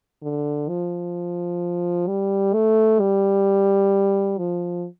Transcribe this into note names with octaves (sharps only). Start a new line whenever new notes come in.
D3
F3
G3
A3
G3
F3